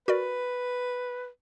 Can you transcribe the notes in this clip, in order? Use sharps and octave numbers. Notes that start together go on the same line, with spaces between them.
F#4 A#4 B4 D5